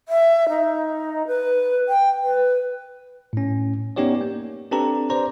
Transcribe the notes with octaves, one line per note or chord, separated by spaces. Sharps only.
E5
D#4
B4
G5
B4
A2 C#4
B3 C#4 D#4 G4 C#5 D5
A#3
C4 D4 G4 A4 B4 A#5
C5 D5 A#5